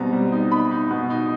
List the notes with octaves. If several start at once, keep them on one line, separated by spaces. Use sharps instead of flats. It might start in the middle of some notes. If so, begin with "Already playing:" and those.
Already playing: B2 G3 C4 A#5
G3
D#4
D#4 B5
D#4
B2
D#4